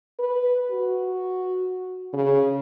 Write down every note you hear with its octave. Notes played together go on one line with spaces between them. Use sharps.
B4
F#4
C#3